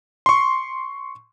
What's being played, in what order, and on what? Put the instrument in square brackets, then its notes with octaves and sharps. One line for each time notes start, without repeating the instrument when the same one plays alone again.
[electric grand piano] C6 C#6